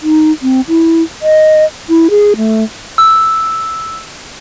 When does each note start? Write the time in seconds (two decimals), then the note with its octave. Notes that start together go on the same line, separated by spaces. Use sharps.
0.01 D#4
0.42 C4
0.69 E4
1.22 D#5
1.89 E4
2.10 G#4
2.37 A3
2.98 E6